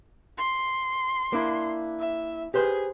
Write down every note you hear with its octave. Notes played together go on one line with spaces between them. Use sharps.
C6
A#3 D4 E4
E5
G4 G#4 B4 C5